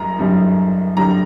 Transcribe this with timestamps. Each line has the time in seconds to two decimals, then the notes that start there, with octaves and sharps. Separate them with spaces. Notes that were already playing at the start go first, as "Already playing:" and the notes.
Already playing: F#1 F#2 G3 A#5
0.19 F#1 F#2 D3 G3
0.97 F#2 D3 G3 A#5